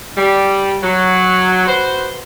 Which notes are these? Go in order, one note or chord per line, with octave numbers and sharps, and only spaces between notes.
G3
F#3
F#4 B4 C5